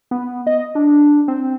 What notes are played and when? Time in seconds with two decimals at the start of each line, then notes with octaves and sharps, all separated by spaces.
0.11 B3
0.47 D#5
0.75 D4
1.28 C4